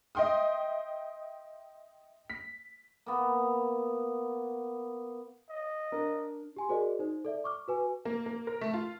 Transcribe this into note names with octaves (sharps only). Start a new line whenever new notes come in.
D#5 E5 G5 C6 D#6
B6
A#3 B3
D#5
D4 A#4
G4 G#5 C6
F#4 G#4 A#4 C5 D5 D#5
D#4 C5
A4 D5 E5
C#6 D6 F6
F#4 B4 G#5
A#3
A#3
A#4
A3
F4